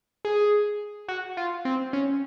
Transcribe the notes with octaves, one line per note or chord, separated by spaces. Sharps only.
G#4
F#4
F4
C4
C#4